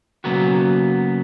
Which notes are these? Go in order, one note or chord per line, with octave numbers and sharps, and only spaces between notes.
C#3 E3 F#3 A#3 B3 F#4